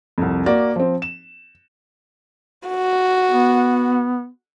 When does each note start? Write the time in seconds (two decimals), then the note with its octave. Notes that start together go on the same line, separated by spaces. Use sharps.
0.18 C2 F2
0.46 A#3 F#4 D5
0.76 F3 C4
1.02 E7
2.68 F#4
3.31 B3